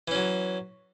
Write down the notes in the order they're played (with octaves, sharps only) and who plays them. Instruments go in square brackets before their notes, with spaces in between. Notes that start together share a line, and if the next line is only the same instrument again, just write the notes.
[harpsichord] E3
C#4
F#3